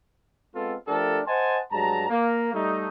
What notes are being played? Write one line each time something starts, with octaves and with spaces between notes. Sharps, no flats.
G#3 B3 C4 F4 A4
F3 A3 D4 G4 A4 A#4
C5 D#5 F#5 G#5 A5 C6
G2 F#3 G#3 A5 A#5
A#3
G3 A3 D#4